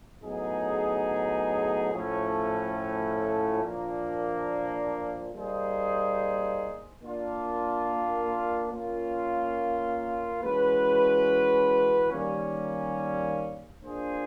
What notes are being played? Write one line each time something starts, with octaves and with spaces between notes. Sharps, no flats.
A2 F#3 B3 D#4 G#4
A2 F3 A3 C#4
A#2 F3 A#3 D4
G3 A#3 D#4 G#4 C5
A#3 D4 F4
A#3 C#4 F4
E3 G#3 C#4 F#4 B4
D#3 G3 A#3 C#4
A#3 D4 F4 G#4 C5